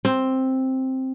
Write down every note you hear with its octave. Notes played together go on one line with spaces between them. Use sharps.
C4